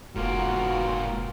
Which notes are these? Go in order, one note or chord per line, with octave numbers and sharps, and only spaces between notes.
F1 G#2 A#3 B3 F4 F#4 A#4